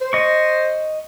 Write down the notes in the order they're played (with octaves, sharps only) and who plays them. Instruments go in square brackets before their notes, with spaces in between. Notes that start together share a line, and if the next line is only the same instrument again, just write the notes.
[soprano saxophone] C5
[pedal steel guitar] D#5 C#6